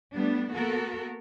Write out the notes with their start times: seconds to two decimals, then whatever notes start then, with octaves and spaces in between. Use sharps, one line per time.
0.14 G3 A3 B3 D4
0.54 A#3 B3 F#4 A4 A#4